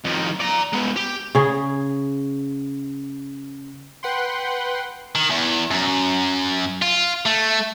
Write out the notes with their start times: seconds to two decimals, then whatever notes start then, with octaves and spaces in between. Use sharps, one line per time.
0.05 F2 D#3
0.40 D5 A#5
0.73 G#3 B3
0.96 G4
1.35 C#3 G#4
4.03 B4 F#5 G5 C6
5.16 D#3
5.30 E2
5.71 F#2
6.82 F4
7.26 A3